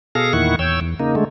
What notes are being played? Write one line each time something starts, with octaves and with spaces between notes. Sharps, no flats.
B2 G#4 A4 F5 A#6
E2 A#2 D#3 E4 F#5 C#6
E2 C#5 G5 E6
E2
C#3 A#3 D#4
D3 G#3 A3